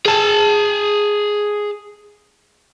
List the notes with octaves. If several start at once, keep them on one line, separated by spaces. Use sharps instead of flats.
G#4 A5